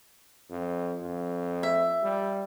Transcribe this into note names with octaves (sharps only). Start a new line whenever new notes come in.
F2
F2
E5
G3